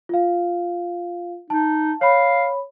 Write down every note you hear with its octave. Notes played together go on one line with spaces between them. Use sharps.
F4 F5
D#4 A5
C#5 F5 B5